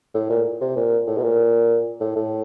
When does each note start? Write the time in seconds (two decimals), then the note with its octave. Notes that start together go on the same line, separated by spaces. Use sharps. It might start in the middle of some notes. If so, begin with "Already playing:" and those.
0.14 A2
0.30 A#2
0.61 C3
0.76 A#2
1.07 A2
1.17 B2
1.23 A#2
2.00 A2
2.16 A2